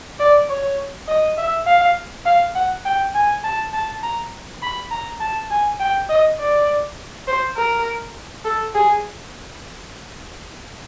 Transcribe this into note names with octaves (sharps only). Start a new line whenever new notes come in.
D5
C#5
D#5
E5
F5
F5
F#5
G5
G#5
A5
A5
A#5
B5
A#5
A5
G#5
G5
D#5
D5
C5
A#4
A4
G#4